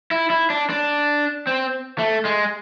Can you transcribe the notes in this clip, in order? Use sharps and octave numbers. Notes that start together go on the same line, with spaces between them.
E4
E4
D4
D4
C4
A3
G#3